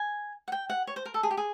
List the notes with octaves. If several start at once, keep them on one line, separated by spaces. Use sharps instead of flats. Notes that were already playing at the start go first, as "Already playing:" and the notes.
Already playing: G#5
F#5
G5
F#5
C#5
C5
A#4
A4
G#4
G4
G#4